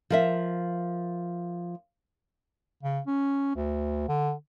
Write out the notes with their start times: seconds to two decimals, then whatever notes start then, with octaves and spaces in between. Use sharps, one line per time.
0.10 F3 A#4 E5
2.83 C#3
3.07 C#4
3.56 D2
4.09 D3